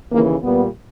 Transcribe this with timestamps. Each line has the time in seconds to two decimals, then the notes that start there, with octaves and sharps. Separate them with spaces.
0.11 D#2 C#3 E3 A#3
0.42 A#2 G3 B3